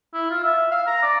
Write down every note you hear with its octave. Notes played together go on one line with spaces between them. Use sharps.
E4
F4
E5
F5
A#5
D5